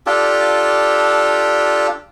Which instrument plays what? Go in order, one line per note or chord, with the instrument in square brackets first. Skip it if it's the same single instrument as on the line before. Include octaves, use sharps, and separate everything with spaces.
[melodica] D4 F4 G4 A4